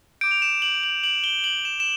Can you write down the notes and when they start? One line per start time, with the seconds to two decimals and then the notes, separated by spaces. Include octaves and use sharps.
0.21 D6 G6 D7
0.31 F7
0.42 E7
0.62 F#7
0.83 F#7
1.04 F#7
1.24 G7
1.44 F#7
1.65 E7
1.80 E7